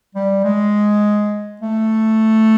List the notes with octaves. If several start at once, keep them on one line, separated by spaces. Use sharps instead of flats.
G3
G#3
A3